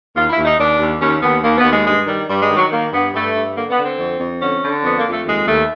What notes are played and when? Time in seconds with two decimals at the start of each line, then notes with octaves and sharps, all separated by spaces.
0.15 D#2 F4
0.30 E4
0.37 D#2
0.45 D#4
0.59 D#2 D4
0.79 D#2
1.00 D#2 C#4
1.22 D#2 B3
1.43 D#2 A#3
1.58 B3
1.64 D#2
1.71 G#3
1.85 G2 G#3
2.07 D#3 G3
2.28 G2 G3
2.42 G#3
2.49 D#3
2.56 F#3
2.71 D#3 A#3
2.93 G2 B3
3.13 G2 A3
3.35 G2
3.55 D3 A#3
3.70 B3
3.77 D3
3.83 C4
3.99 F2
4.20 F2
4.41 D3 C#4
4.62 D3
4.84 F2 B3
4.97 A#3
5.04 F2
5.11 A3
5.25 D#2 G#3
5.47 D#2 A3